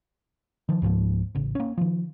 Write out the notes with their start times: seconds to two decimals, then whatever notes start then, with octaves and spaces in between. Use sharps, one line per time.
0.69 D#3 F3
0.82 C#2 G#2 F3 A#3
1.35 A1 C#3
1.55 A#3 C#4
1.78 D#3 F3